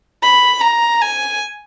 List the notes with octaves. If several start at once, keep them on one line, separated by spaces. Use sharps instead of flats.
B5
A#5
G#5